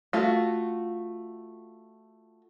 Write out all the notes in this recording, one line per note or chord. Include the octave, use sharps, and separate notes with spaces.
A3 F4 F#4